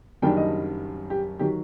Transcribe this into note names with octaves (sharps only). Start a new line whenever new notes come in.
F#1 F#2 D#3 G3 D4 G5
D#5
G4
D#3 F#3 G4